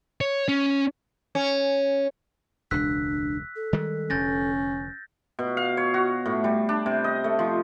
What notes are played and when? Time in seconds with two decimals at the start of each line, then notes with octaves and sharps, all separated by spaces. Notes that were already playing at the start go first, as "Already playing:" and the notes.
0.21 C#5
0.48 C#4
1.35 C#4
2.71 E1 C#2 D4 E6 F#6 B6
3.56 A4
3.73 D#3 G3 G#3
4.10 F1 D3 C#4 G6 A6 A#6
5.39 B2
5.57 F5
5.77 C#5
5.94 F#4
6.26 A2
6.44 G3
6.69 D4
6.86 C3
7.04 D#5
7.24 A3
7.39 F3